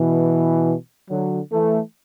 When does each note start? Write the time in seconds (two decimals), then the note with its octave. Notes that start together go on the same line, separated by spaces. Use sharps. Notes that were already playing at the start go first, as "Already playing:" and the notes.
Already playing: B2 E3
1.10 D3 F#3
1.51 E3 A3